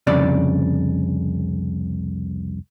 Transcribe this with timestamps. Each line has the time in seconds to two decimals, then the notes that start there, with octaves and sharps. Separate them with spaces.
0.07 C2 F2 C#3 D4 D5